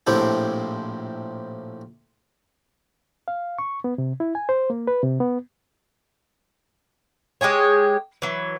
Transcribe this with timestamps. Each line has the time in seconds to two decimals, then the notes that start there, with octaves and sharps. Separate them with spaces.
0.07 A#1 A2 F3 C4 E4 G4
3.28 F5
3.58 C#6
3.84 B3
3.98 C3
4.20 E4
4.35 G#5
4.49 C5
4.70 A#3
4.87 B4
5.03 C3
5.20 B3
7.41 G#3 G4 G#4 C#5
8.22 E3 F#3